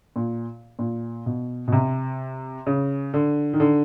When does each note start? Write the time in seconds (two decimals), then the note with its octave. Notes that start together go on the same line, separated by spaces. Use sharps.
0.16 A#2
0.79 A#2
1.26 B2
1.68 B2
1.72 C3
2.67 C#3
3.14 D3
3.53 D#3
3.60 D3